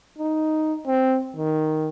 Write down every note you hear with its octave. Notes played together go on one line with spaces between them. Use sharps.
D#4
C4
D#3